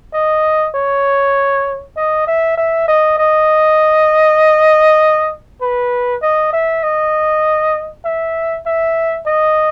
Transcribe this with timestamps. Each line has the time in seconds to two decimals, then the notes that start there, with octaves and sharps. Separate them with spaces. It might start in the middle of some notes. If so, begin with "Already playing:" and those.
0.14 D#5
0.75 C#5
1.96 D#5
2.27 E5
2.57 E5
2.88 D#5
3.18 D#5
5.61 B4
6.22 D#5
6.53 E5
6.83 D#5
8.05 E5
8.66 E5
9.26 D#5